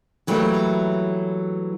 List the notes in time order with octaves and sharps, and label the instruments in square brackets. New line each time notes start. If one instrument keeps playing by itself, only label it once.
[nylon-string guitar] E3 F#3 G3 A3 A#3